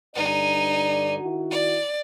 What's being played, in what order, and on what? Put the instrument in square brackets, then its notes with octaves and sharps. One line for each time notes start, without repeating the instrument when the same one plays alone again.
[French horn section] G2 D3 D5 [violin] D#4 G#5
[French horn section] D#3 E4 F#4
[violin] D5